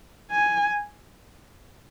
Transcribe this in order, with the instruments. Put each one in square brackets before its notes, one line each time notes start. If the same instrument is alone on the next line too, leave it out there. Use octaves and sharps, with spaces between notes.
[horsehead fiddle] G#5